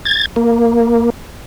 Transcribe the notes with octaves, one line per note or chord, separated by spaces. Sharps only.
G#6 A6
A#3